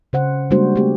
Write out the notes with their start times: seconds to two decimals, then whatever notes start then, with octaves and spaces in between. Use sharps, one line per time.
0.13 C#3 C5 F#5
0.51 G3 G#3 A#3 D4 F#4 C5
0.76 A3 B3 G4